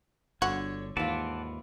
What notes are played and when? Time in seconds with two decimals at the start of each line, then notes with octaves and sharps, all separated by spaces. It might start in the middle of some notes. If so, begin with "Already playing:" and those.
0.42 G1 D3 F#4 C#5
0.97 D#2 G#2 E3 F4 F#5 A5 D6